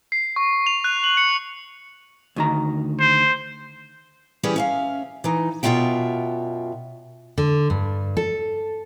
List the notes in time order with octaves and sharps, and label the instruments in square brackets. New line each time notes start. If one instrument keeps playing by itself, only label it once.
[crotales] C7
C#6
F7
F#6
F#7
C#7
[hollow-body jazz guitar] D2 D#3 A#5
[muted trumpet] C5
[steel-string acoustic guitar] E3 G3 C#4 G4 G#4 B4
C#4 E5 F5
E3 D#4
F#2 B2 D4 F4 E5 G5
[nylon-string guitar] D3
G2
A4